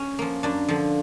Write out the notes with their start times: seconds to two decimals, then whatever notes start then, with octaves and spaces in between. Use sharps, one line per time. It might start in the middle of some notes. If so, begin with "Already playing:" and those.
Already playing: C#4
0.19 F3 A#3
0.43 F#2 D4
0.68 D3 F3